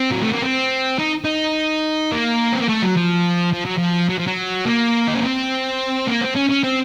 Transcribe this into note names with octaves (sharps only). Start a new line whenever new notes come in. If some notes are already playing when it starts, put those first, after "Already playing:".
Already playing: C4
F#3
A3
A#3
C4
D#4
D#4
A#3
C4
A#3
A3
F#3
F3
F3
F#3
F3
F#3
F3
F#3
A#3
D#4
C#4
C4
A#3
C4
C#4
C#4
C4